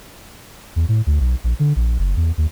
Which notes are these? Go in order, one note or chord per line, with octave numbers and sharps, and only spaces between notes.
E2
A2
D2
B1
A#1
D3
A#1
F#1
E2
D#2